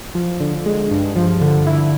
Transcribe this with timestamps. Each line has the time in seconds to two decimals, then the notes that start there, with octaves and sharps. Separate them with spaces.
0.15 F3
0.40 D3
0.66 G#3
0.91 G2
1.16 F3
1.41 D3
1.67 E4